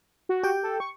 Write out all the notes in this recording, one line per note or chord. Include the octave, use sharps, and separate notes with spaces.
F#4
G4 G5
A4
C#6